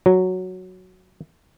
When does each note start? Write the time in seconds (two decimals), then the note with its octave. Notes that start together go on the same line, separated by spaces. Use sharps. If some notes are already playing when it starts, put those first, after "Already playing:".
0.06 F#3